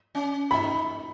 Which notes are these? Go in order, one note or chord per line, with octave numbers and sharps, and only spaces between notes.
C#4
D#4 B5